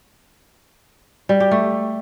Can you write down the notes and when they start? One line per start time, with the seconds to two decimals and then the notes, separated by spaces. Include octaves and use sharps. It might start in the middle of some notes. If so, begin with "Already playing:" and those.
1.29 G3
1.40 G4
1.51 A3